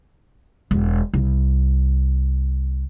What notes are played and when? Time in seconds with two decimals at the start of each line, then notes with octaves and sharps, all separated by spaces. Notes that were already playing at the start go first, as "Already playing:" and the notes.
0.71 E1
1.14 C2